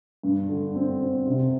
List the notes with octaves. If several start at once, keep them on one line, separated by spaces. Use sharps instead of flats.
G2
D3
C4
C4
C3